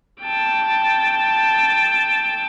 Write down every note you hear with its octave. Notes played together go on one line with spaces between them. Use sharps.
G5 A5